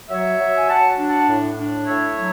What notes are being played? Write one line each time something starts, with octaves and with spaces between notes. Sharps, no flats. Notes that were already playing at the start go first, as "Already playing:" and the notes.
F#3 C#5 E5
F#3
G#5
F#3 F#5 A5
D4
F#5 A5
A2
D4
A2 C#5 E5
F#3